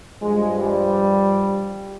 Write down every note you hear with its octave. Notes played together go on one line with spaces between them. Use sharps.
G2 F3 G#3
G3